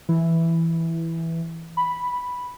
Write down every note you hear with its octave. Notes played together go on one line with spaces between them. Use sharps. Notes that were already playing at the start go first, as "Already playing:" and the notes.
E3
B5